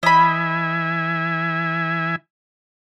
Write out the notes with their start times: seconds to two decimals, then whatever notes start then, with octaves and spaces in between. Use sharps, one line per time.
0.03 E3 D#5 E5 G#5 B5